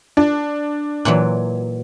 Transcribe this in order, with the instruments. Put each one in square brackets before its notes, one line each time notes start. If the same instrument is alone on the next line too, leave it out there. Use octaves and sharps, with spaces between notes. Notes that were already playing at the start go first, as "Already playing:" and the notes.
[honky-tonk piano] D4
[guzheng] A#2 E3 F#3